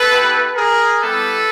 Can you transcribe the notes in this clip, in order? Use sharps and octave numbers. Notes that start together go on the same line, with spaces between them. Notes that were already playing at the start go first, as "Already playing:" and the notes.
Already playing: A4 B4
B3 E4 G4
G#4 A#4
G3 B3 E4 G4 A4 B4